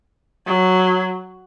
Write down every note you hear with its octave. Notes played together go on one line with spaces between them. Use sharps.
F#3